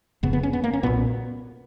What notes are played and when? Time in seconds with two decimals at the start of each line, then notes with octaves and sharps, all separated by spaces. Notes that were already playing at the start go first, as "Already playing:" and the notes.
0.23 F1 F2 C#3 B3
0.33 B3
0.43 C#4
0.53 B3
0.64 A#3
0.73 C#4
0.83 B1 A#2 B3